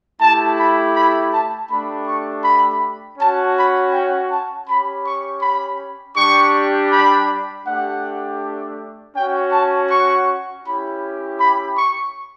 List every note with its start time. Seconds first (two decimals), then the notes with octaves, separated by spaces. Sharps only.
0.20 A3 E4 G4 A5
0.57 B5
0.95 B5
1.31 A5
1.69 A3 D4 G4 B5
2.06 C#6
2.43 B5
3.18 C#4 F#4 A5
3.55 B5
3.93 G5
4.30 A5
4.67 C#4 G4 B5
5.04 C#6
5.42 B5
6.17 G3 D4 G4 C#6
6.91 B5
7.66 A3 D4 G4 F#5
9.15 C#4 F#4 G5
9.52 A5
9.90 C#6
10.64 C#4 E4 G4 B5
11.39 B5
11.76 C#6